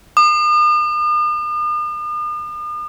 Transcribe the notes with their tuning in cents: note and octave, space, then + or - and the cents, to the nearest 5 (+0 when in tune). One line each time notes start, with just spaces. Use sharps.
D#6 -45